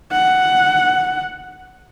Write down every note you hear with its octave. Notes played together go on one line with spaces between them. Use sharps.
F#5